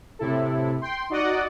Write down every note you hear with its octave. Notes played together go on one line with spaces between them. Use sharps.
A2 C3 E4 A4
G5 C6
D#4 F#4 D5 D#5 F#5